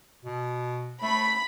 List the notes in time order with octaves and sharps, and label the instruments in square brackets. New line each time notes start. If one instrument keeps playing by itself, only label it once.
[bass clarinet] B2
[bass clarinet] A3 [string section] B5